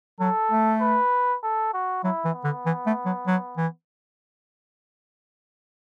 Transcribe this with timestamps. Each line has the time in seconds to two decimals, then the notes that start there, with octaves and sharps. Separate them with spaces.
0.20 F#3 A4
0.51 A3
0.81 B4
1.43 A4
1.73 F#4
2.04 F#3 E4
2.25 E3
2.34 B3
2.44 D3
2.66 E3
2.86 A3
3.06 F#3
3.27 F#3
3.57 E3